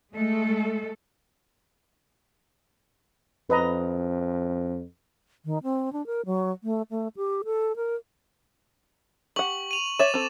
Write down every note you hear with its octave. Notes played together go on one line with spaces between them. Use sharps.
G#3 A3 A4
F2 B4 D#5 A#5
D#3
C4
D4
A#4
F#3
A3
A3
G4
A4
A#4
G4 F#5 C#6 F#7
D#7 F7
C#5 E5 D6 A6 E7
C4 A4